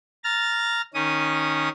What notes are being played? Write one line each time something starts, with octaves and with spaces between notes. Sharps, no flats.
A#5 F6 A6
D#3 C#4 D#6